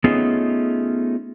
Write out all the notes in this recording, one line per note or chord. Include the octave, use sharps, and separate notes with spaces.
A3 B3 C#4 D#4 F4 G#4